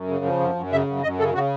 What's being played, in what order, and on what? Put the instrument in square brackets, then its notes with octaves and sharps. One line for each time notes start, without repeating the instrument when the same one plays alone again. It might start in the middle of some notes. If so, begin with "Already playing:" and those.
Already playing: [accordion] F#2
C#3
F3
F#2
F#2
C#3 E5
F#2
F#2 D#5
C#3 A4
C#3 F#4